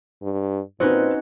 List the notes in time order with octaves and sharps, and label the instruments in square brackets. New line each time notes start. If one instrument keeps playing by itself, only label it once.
[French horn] G2
[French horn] A#2 [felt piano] C4 B4 [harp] C#4 D#4 F#4